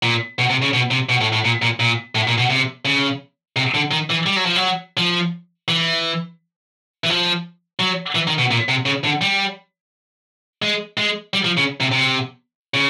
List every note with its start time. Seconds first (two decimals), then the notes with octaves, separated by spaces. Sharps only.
0.03 A#2
0.39 B2
0.49 C3
0.62 C#3
0.73 B2
0.91 C3
1.09 B2
1.21 A2
1.33 A2
1.45 A#2
1.62 A#2
1.80 A#2
2.15 A2
2.27 A#2
2.38 B2
2.50 C3
2.85 C#3
3.56 C3
3.74 D3
3.91 D#3
4.10 E3
4.26 G3
4.36 F#3
4.46 F3
4.56 F#3
4.97 F3
5.68 E3
7.04 E3
7.09 F3
7.79 F#3
8.15 E3
8.27 D#3
8.38 B2
8.51 A#2
8.68 C3
8.86 C#3
9.04 D3
9.21 G3
10.62 G#3
10.97 G#3
11.33 G3
11.44 F3
11.57 C#3
11.81 C3
11.92 C3
12.74 C#3